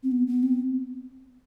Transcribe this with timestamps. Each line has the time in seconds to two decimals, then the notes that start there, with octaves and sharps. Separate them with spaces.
0.03 C4
0.12 B3
0.27 B3
0.43 C4